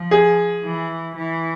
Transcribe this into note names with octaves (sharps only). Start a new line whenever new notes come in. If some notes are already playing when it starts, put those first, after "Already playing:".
Already playing: F3
G#4
E3
E3